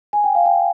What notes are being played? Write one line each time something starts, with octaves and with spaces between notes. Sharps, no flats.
G#5
G5
F5
G5